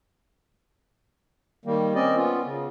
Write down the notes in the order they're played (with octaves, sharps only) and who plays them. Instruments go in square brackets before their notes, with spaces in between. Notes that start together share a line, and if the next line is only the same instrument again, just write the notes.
[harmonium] D#3 G3 A#3
C4 C#4 D5 D#5
B3 C#4 F4
C#3